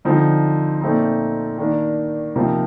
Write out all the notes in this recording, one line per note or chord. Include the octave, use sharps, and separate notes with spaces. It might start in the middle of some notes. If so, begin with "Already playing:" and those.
D3 F3 C4 D#4
A#2 A3 C4 D#4
D#3 A#3 D4
C3 F3 A#3 D#4